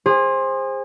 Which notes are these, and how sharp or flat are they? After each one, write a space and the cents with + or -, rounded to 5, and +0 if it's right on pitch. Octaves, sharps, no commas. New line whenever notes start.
G#4 -30 C5 +15